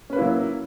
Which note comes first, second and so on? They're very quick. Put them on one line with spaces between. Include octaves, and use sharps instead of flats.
C#4 B4 A#3 E4 F#3